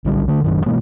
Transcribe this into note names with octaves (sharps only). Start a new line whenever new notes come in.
B1 D3 G3
D3 A3
F#1 F#2 D#3
B2 E3 G#3 A#3